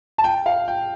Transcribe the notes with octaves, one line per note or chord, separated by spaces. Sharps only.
A5
G5
F5
G5